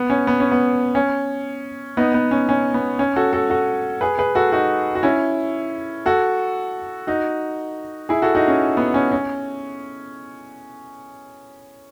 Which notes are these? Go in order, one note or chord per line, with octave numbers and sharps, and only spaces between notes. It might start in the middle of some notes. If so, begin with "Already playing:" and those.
Already playing: B3
C#4
B3
C#4
B3
C#4
B3 D#4
B3
C#4
C#4
B3
C#4
F#4 A4
F#4 A4
F#4 A4
G#4 B4
G#4 B4
F#4 A4
D#4 F#4
F#4
C#4 E4
F#4 A4
D#4 F#4
E4 G#4
F#4 A4
D#4 F#4
C#4
B3
C#4
C#4